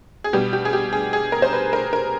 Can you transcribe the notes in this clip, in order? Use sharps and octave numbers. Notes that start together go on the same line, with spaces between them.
G#4
B2 G3 B3 G4
G4
G#4
G4
G#4
G#4
A#4
C5
B4
A#4
A#4